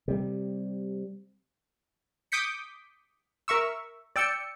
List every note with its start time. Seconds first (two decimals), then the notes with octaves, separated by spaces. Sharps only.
0.08 C3 G3
2.32 D6 D#6 G6 B6 C#7
3.48 A#4 E5 C#6 E6
4.16 D5 G5 E6 C#7